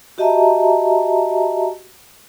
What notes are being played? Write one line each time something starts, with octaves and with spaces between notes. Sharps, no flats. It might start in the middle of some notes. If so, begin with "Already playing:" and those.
F#4 G4 D#5 E5 A5 A#5